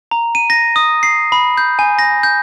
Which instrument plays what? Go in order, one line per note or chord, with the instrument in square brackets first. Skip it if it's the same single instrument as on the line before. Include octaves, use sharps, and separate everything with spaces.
[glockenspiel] A#5
D#7
A#6
D#6
C7
B5
G6
G#5
A#6
G6